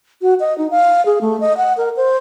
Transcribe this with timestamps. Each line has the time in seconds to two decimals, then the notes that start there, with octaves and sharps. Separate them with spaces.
0.22 F#4
0.40 D#5
0.58 D#4
0.71 F5
1.06 G#4
1.21 A3
1.40 D#5
1.57 F#5
1.77 A#4
1.97 C5